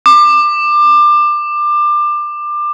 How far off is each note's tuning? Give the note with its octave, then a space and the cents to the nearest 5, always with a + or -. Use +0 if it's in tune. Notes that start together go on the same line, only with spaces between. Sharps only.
D6 +25